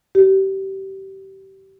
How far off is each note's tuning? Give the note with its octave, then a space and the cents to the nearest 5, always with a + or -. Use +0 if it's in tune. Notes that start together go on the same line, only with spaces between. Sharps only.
G4 -25